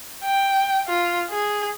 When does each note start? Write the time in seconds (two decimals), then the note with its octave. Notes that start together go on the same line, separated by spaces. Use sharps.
0.25 G5
0.88 F4
1.30 G#4